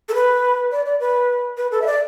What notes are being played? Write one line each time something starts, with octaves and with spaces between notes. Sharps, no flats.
A4
B4
D5
D5
B4
B4
A4
E5
D5